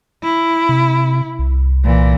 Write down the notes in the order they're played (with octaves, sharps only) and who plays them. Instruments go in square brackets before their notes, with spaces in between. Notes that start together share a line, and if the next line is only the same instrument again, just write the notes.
[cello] E4
[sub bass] C3
C2
[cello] A#2 E3